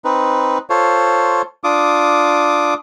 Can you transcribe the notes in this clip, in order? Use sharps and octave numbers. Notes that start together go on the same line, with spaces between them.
C4 D#4 B4
F4 A4 C5 C#5
D4 F4 D6 D#6